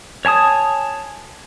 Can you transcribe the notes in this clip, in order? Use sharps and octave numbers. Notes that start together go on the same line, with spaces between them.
C#5 G#5 A5 D#6